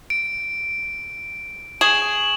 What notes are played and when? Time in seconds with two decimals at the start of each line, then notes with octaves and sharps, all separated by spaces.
0.10 D7
1.81 G#4 C#6 E7 F#7